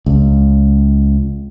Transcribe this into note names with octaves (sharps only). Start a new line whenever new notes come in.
C#2